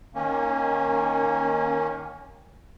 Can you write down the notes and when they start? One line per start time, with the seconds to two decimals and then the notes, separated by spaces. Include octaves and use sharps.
0.15 D#3 A#3 C#4